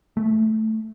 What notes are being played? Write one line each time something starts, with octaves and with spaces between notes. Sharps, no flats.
A3